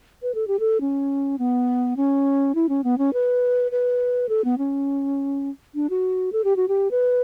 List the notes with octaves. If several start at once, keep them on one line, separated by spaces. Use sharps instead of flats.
B4
A4
G4
A4
C#4
B3
C#4
E4
C#4
B3
C#4
B4
B4
A4
B3
C#4
D4
F#4
A4
G4
F#4
G4
B4